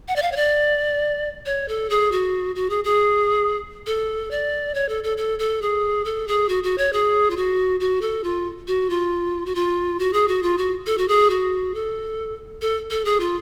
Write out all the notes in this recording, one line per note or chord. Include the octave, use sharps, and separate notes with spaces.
F#5
D5
F5
C#5
D5
C#5
A4
G#4
F#4
F#4
G#4
G#4
A4
D5
C#5
A4
A4
A4
A4
G#4
A4
G#4
F#4
F#4
C#5
G#4
F4
F#4
F#4
A4
F4
F#4
F4
F#4
F4
F#4
G#4
F#4
F4
F#4
A4
F#4
G#4
F#4
A4
A4
A4
G#4
F4